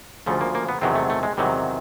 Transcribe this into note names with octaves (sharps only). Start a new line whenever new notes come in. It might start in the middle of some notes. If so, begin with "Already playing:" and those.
D2 C#3 F3 A3
A#3
A#3
B3
E2 C3 D#3 F#3 C4
A3
A3
G#3
E2 C3 D#3 F#3 G3